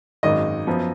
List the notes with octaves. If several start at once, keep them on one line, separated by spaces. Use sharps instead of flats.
G#1 F#2 D#3 G#3 D#5
F#2 F3 B3